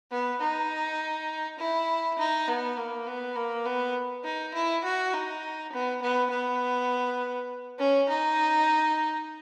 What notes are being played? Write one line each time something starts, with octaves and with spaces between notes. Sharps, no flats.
B3
D#4
E4
D#4
B3
A#3
B3
A#3
B3
D#4
E4
F#4
D#4
B3
B3
B3
C#4
D#4